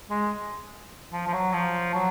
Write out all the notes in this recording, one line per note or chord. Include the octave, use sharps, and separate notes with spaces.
G#3
F3
F3
F#3
F3
F#3